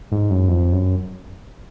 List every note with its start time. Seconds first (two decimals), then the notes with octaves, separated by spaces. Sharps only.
0.12 G#2
0.30 F#2
0.48 F2
0.72 F#2